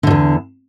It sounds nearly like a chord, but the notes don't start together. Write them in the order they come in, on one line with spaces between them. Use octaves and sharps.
D3 G#2 E2